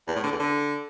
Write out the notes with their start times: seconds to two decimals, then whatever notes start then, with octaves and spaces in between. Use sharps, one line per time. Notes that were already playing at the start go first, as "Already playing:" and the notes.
0.07 E2
0.15 A2
0.23 D3
0.32 E2
0.40 D3